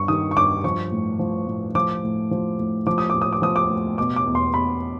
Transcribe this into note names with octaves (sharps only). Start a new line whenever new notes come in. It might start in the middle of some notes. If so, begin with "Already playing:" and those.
Already playing: G2 C#6
D#3 D#6
C#6
G2 D6
F3 C#6
A2
F3
A2
F3 D6
A2
F3
A2
F3 D6
D#6
A2 D6
D#6
D6
F3 D#6
D6
A2
B2 D6
D6
E2
C6
B2 B5